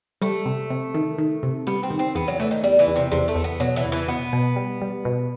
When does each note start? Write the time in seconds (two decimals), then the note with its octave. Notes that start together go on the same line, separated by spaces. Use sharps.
0.22 G3 A3
0.46 C3
0.70 C3
0.94 D#3
1.18 D#3
1.43 C3
1.67 G3 B3
1.83 C4
1.91 D#3
1.99 C4
2.15 E2 B3
2.28 F#3
2.40 E3 A3
2.51 D#3
2.63 E2 G3
2.79 E3
2.87 E2
2.96 C3
3.12 E2 C3
3.28 A3
3.36 E2
3.44 B3
3.60 B2 F#3
3.76 E3
3.85 E2
3.92 E3
4.08 B2 B3
4.33 B2
4.56 G3
4.81 G3
5.05 B2